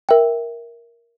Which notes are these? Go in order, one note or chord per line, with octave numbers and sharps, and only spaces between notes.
A#4 E5 G5